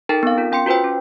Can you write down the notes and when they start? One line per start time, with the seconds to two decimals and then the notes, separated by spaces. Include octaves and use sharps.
0.09 D#4 A4 A#4 G5 A5
0.23 B3 C4 F5
0.38 F4 A#4
0.52 C#4 G5 C6 C#7
0.66 F4 F#4 B4 C5 G5
0.84 C#4